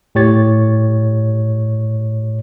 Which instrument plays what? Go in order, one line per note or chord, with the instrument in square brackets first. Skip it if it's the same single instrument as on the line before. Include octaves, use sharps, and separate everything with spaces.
[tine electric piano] A2 G4 C#5 A6